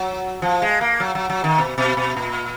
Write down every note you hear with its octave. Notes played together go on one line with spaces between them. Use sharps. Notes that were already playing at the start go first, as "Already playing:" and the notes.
Already playing: F#3
F3
G#3
A#3
F#3
F#3
F#3
D#3
B2
B2
B2
A#2